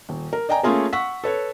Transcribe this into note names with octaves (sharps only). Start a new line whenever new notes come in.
D#1
A#4
D5 D#5 G5 G#5 A#5
A3 A#3 C#4 F4 G#4 A#4
F#5 C#6 E6 B6
A4 B4 C#5